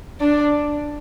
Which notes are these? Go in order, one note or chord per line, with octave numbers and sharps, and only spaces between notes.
D4